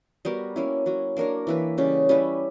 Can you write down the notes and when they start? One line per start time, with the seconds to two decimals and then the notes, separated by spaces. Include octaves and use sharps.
0.25 G3 B3 F#4 A#4
0.56 A#3 C#4 E4
0.86 F#3 C#4 F#4
1.17 A#3 D4 A#4 C#5
1.47 E3 A#3 E4 B4
1.78 C#3 G3 C#4
2.09 G3 C#4 E4 B4